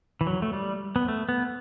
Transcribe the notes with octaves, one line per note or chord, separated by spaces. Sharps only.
E3
F#3
A3
G3
B3
A3
B3